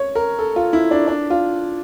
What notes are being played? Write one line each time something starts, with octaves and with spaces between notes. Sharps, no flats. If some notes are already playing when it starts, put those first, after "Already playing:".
Already playing: C#5
A#4
A4
F4
E4
D4
D4
F4